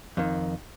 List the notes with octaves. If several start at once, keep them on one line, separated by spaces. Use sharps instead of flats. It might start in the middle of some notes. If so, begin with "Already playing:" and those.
F2 D#3